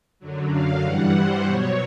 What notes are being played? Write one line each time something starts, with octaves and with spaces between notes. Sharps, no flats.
F#2 D3 F#3
F5
G2 E3 G3 F#5
C5
B2 F#3 C#5